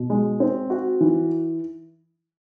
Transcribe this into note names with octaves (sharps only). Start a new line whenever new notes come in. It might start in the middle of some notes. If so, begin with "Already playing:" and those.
Already playing: B2
G#3
C4
F#4
E3